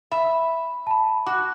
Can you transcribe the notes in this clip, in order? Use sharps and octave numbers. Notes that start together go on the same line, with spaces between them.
E5 B5
A5 B5
F#4 D6 F#6